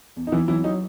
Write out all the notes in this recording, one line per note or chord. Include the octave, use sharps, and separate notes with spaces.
E2
D#4
E2 E3 E4
E3 F#3 E4
F#3 D#4